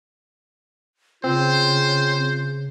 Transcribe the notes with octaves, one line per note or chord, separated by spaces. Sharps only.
C#3 C4 F4 C5